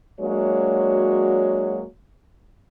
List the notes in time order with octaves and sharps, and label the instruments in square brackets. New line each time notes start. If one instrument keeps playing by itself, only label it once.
[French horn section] F#3 G#3 A#3 D4 F#4 C#5